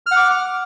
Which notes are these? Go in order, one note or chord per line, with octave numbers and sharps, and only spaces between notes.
F#5 D6 F6